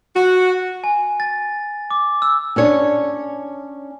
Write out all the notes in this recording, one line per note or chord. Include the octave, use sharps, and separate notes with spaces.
F#4
G#5
A6
D6
E6
C#4 D4 C#5